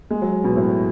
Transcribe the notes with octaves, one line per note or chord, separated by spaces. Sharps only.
G#3
F#3
B2
A2